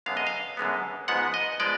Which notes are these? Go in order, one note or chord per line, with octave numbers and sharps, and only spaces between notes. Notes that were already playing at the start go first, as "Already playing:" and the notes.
F#2 D3 G#3 B3 F5
D#5
F5
F#2 D3 G#3 B3
G#2 F3 G#3 B3 F#5
D#5
F3 G#3 B3 D5